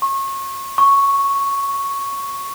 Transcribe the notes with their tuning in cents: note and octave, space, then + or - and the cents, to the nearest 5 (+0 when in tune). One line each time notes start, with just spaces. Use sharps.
C#6 -30
C#6 +0